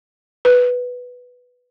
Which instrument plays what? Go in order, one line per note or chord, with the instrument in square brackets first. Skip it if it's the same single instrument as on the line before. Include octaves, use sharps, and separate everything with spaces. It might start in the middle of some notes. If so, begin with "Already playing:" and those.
[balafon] B4